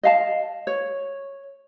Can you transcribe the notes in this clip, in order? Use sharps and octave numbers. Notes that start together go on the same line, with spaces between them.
D#5 F5 A5
C#5